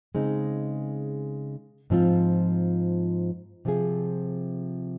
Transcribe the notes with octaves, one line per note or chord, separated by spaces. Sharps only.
C#3 G#3 C4 D#4
G#2 F3 C4 F4
C3 F3 C4 F4 G#4